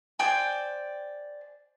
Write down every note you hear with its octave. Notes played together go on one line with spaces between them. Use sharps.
C5 D5 G5 G#5